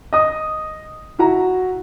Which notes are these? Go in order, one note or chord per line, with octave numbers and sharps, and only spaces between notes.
D#5 D#6
E4 F#4 A#5